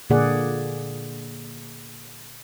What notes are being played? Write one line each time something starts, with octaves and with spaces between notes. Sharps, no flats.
A#2 D3 A#3 G#4 D5 F#5